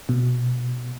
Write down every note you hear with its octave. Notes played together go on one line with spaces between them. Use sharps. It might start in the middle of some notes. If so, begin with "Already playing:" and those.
B2